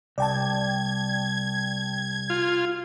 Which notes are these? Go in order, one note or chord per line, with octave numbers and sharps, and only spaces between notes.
C2 D5 G5 A5 G#6
F4